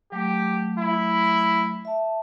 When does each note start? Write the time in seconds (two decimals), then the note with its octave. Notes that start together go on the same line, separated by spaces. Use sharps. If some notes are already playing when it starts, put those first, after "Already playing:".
0.12 F#3 A3 G4
0.79 E4
1.85 E5 A5